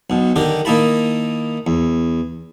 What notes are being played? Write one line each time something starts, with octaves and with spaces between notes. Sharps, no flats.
B1 B2
D3 D#3 G4 A#4
D#3 A#3 D#4 E4 A5 B5
E2